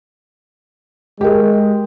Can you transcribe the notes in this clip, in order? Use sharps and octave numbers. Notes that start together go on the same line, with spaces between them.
G#3 G4 A#4